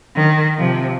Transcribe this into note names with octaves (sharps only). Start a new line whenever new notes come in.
D#3
C3 F3